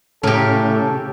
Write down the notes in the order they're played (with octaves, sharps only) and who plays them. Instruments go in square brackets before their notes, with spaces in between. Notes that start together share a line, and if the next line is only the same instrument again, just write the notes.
[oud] A2 [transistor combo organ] C#3 [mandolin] G4 A#4 [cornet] A4